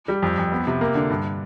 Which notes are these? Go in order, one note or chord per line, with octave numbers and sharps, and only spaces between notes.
G3
F2
F2
B3
C3
A#3
D3
G2